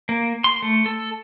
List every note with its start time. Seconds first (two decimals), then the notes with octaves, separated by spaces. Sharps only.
0.09 A#3
0.44 C6
0.62 A3
0.86 A4